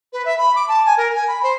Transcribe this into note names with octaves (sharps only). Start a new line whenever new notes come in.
B4
E5
B5
D6
A5
G#5
A#4
G#5
B5
C5